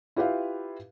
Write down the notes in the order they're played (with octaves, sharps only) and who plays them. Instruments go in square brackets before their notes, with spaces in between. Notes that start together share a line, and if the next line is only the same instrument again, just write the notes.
[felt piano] E4 F4 G4 B4 E5 F5